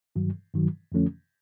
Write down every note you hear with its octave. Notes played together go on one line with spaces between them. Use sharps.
G2 D#3 F#3
G2 D#3 F#3
F2 D3 F3 A3 C#4